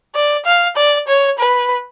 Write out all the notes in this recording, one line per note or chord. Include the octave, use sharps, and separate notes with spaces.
D5
F5
D5
C#5
B4